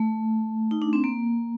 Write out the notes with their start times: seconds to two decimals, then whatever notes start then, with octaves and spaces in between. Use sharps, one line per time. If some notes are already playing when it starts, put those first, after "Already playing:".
Already playing: A3
0.71 D#4
0.82 D4
0.93 C4
1.04 A#3